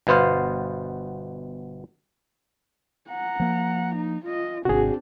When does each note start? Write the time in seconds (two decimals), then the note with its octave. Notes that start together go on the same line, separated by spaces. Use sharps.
0.07 G1 B2 B3 C5 F5
3.10 F#5 A#5
3.40 F3 A#3
3.95 D#4
4.25 F4 D#5
4.65 G#1 C3 C4 D4 F#4 G#4